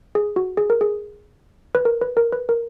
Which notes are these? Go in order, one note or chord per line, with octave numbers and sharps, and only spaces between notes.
G#4
F#4
G#4
A#4
G#4
B4
A#4
B4
A#4
B4
A#4